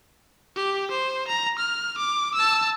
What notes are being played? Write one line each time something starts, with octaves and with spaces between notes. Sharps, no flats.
G4
C5
A#5
F6
D6
A5 E6